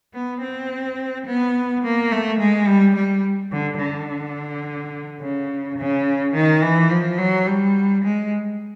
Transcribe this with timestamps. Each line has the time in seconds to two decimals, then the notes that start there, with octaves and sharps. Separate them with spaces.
0.14 B3
0.42 C4
1.26 B3
1.83 A#3
2.11 A3
2.39 G#3
2.68 G3
2.95 G3
3.52 D3
3.80 D3
5.21 C#3
5.78 C#3
6.35 D#3
6.62 E3
6.90 F3
7.18 F#3
7.46 G3
8.03 G#3